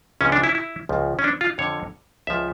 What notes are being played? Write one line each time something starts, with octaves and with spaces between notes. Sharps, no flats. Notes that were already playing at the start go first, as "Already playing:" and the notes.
C#2 C#3 F3 C#4
D4
E4
E4
C#2 C#3 F3
C#4
D4
F4
F2 D3 F3 C#5
C#2 C#3 F3 E5